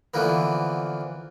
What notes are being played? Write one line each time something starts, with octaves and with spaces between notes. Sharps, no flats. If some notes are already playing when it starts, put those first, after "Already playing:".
D3 E3 F3 A#3 B3